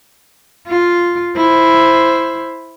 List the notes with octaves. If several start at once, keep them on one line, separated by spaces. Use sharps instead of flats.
F4
E4 C5